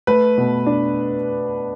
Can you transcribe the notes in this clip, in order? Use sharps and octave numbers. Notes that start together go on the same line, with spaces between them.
A3 B4
B2
D4